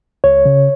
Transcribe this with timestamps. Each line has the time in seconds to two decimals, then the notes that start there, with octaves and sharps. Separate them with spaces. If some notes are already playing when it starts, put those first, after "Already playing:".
0.24 C#2 C#5
0.45 C#3